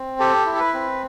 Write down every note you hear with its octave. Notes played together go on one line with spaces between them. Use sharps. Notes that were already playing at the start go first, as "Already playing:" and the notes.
Already playing: C4
G4 A4
E4
A4
B4
C4